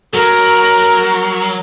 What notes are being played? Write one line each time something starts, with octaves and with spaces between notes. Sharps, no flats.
F#3 A#4